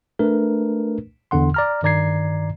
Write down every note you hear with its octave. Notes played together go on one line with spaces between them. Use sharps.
A3 D4 A#4 B4
E2 D3 F#5 C6
D5 A#5 F6
G2 D#3 D5 A#5 G#6 C7